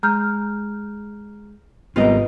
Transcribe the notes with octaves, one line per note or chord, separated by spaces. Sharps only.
G#3 A#5 F6 G6
G#1 C3 G3 B3 F4 A#4 B4 D#5